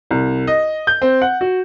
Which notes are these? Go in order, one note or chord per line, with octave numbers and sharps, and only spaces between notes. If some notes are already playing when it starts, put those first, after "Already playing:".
C2
D#5
G6
C4
F#5
F#4